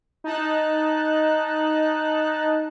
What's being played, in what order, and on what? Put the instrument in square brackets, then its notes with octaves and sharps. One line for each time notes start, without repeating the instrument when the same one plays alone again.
[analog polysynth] D#4 A5 F#6